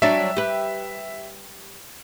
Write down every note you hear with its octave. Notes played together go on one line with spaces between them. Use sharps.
F#3 G3 D4 E5
G4 B4